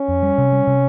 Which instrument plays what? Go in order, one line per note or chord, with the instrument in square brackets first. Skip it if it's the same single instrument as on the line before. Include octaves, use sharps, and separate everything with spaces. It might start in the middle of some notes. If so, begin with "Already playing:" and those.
Already playing: [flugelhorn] C#4
[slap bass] F2
G3
C3
G3
C3